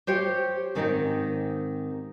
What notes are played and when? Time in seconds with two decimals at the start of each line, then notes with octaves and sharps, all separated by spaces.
0.07 G4 C5 C#5 G5
0.75 G#2 D#3 C4 D#4 E4 G4